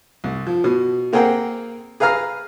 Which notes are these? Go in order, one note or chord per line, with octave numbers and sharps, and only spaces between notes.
C2
F3
B2
A#3 C4 G#4 A#4 F#5 G5
G#4 B4 F5 A#5 F6